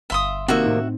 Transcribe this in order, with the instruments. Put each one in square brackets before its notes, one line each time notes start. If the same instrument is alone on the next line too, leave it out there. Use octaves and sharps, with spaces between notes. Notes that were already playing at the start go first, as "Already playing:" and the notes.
[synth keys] G1 F5 [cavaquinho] E5 C6 D#6
[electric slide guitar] C3 D#3 A#3 [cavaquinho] F#4 E5
[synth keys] A2 C4 D#4